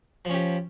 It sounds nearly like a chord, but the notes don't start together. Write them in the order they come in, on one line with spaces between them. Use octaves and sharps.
F3 C#4 G4